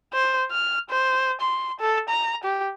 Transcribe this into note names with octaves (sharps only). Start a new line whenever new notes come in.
C5
F6
C5
C6
A4
A#5
G4